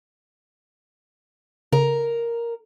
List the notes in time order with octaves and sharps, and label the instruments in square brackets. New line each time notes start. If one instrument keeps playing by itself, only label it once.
[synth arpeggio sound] C#3 [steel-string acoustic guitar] A#4